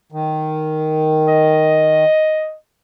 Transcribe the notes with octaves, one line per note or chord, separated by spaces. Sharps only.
D#3
D#5